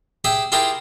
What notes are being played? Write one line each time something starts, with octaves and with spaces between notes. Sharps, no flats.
G4 G#4 E5 G#5
E4 F4 G4 G#4 A#4